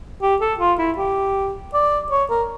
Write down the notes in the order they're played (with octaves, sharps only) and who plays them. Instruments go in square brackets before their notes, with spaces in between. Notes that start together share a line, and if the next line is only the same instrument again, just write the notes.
[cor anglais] G4
A4
F4
E4
G4
D5
C#5
A#4